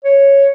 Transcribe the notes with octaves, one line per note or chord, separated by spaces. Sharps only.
C#5